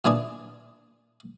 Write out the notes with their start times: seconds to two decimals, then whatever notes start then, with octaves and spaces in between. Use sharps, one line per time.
0.05 A#2 E3 D4 G#4